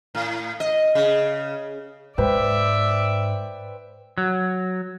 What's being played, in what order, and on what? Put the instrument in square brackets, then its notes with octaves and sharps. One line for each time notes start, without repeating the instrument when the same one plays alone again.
[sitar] A2
D#5
C#3
[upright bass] G#2 [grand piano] B4 C5 G5 [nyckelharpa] D5 E5
[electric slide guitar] F#3